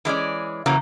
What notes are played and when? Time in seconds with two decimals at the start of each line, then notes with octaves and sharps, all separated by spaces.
0.05 E3 G#3 C#4 D5
0.66 C#3 E3 F#3 A#3